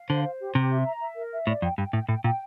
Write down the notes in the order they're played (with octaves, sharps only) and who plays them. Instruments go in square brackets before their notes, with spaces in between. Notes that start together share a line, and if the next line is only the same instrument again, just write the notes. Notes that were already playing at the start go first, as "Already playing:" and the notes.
Already playing: [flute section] F5
[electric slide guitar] D3 [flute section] C5
[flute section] C5
G4
[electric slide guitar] C3 [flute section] G4
[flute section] E5
A#5
E5
A#4
E5
[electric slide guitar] A2 [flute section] D5
[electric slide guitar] F2 [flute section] G5
[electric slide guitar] G2 [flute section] G5
[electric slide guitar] A2 [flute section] G5
[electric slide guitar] A2 [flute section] G5
[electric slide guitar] A#2 [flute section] G5